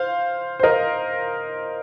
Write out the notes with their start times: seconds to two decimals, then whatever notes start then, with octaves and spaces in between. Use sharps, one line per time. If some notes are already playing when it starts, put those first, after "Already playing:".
Already playing: C5 F5
0.60 C5
0.63 A#4 D#5